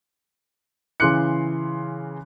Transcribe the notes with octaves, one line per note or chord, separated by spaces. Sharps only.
C#3 E3 C6 D6 F#6 C#7